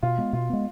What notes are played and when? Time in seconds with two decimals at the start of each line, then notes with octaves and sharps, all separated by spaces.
0.03 B2 F4
0.18 G#3 B3
0.33 B2 F4
0.50 G#3 B3